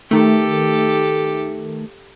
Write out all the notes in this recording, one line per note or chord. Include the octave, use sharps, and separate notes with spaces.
D#3 A3 G4 A4